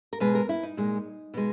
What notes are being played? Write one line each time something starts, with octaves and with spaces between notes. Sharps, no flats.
A#4
B2 G#3 B4
A#4
E4
D#4
A#2 G#3
B2 G#3